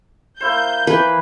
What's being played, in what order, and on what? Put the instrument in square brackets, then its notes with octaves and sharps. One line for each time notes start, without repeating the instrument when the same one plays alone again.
[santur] A#3 E4 C5 [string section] G6
[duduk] E3 [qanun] B4